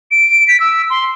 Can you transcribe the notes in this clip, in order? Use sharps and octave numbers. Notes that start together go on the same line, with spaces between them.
D7
B6
E6
C6